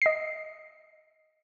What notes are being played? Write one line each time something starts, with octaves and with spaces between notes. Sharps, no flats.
D#5 C7